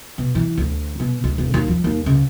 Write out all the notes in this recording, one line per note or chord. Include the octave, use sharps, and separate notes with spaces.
B2
E3
D2
B2
D2
E1
D#2
F3
D#2
C#2